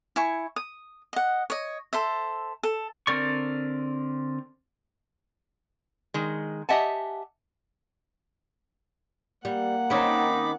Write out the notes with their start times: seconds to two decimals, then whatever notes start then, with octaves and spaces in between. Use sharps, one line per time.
0.16 E4 G#5 C#6
0.56 D#6
1.13 D#5 F#5
1.50 C#5 D#5
1.93 A4 C5 E5
2.63 A4
3.07 D3 C4 A#4 D5 C#6
6.14 D#3 G#3
6.69 G4 D#5 E5 F#5 G#5 A5
9.45 G3 A#3 F#5
9.90 D#3 C4 C#4 D#4 B5 D6